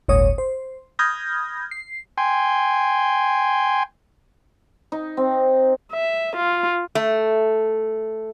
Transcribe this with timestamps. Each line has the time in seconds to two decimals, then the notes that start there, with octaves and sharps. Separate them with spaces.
0.08 G1 D2 A2 C#5 D#6
0.38 C5
0.99 B5 D#6 F6 G6 G#6 A#6
1.71 C7
2.18 G5 G#5 C6
4.92 D#4
5.17 C4
5.93 E5
6.37 F4
6.95 A3